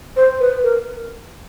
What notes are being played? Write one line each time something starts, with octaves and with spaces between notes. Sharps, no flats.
C5
B4
A#4